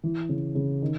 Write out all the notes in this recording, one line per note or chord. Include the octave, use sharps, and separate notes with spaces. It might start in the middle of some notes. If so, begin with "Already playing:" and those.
E3
C#3
C#3
D#3